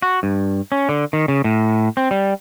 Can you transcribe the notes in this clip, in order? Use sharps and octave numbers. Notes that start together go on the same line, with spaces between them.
F#4
G2
C#4
D3
D#3
C#3
A2
C4
G3